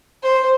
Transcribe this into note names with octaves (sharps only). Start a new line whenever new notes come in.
C5